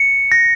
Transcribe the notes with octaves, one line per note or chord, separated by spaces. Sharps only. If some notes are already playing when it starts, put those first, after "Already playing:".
Already playing: C#7
A#6